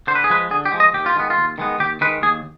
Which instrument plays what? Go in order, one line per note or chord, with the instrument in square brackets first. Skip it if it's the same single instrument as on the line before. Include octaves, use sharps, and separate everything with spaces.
[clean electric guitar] D3 C5
B4
G#4
F3 G#3 B4
D3 G#4
G4
F3 G#3
D#5
D#2 G4
F4
D#3 G#3 B3
F4
D#2
D#3 G#3 B3
D#2 G4
D#3 G#3 B4
D#2 G#4